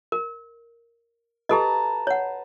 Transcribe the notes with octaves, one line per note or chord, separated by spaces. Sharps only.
A#4
G4 A4 B4 D#5 A5 A#5
C#5 F#5